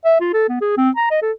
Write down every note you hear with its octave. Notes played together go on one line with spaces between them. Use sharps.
E5
F4
A4
B3
G#4
C4
A#5
D#5
A4